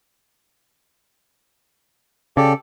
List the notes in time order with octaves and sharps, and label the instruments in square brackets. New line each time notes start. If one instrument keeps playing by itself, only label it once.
[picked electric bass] C#3 [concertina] G4 A4 D5